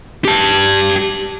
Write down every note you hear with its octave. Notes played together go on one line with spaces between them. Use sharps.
G4 A5